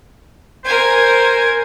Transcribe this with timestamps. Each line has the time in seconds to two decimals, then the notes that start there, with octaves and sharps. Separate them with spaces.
0.65 A#4 C5 G#5